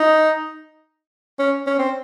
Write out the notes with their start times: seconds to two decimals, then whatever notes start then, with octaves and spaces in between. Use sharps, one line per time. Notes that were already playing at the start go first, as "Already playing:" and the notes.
Already playing: D#4
1.39 C#4
1.67 C#4
1.79 C4